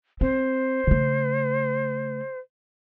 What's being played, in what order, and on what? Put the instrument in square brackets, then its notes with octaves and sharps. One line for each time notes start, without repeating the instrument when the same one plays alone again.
[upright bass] C4 [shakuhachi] C5
[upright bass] C#3 A3